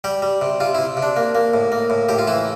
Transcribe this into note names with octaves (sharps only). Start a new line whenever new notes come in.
G3 G4
G3
C3
C3 F4
C3 E4
C3
D4
A#3
A#3
A2
A#3
A2
A2 G4
F4
E3 E4